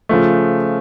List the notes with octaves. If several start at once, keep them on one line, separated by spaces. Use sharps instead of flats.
C#3 F3 A3